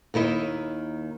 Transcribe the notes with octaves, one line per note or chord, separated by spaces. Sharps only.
D#2 D#3 E4 D#5